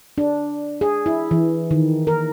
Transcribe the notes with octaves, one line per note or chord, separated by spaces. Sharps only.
D4
G#4
E4
E3
D#3
A#4